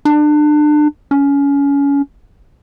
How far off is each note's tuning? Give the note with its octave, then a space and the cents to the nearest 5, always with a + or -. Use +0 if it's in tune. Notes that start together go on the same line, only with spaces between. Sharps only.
D4 +30
C#4 +25